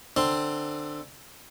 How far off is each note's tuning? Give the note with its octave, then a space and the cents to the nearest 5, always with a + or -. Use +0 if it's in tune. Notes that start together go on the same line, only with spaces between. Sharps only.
D3 +20 C4 +15 C6 +0